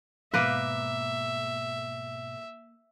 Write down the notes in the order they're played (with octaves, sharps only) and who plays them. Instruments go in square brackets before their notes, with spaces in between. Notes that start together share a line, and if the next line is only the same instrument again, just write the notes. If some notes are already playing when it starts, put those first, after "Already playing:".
[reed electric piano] G#2 B2 D6 [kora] A#3 B4 [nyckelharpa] E5